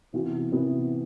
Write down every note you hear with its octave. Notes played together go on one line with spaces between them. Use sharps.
C3 E3 B3 F#4
C3 E3 B3 F#4